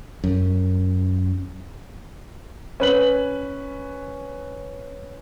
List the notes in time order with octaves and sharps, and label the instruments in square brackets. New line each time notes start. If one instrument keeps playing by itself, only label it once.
[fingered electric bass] F#2
[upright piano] C#4 B4 F#7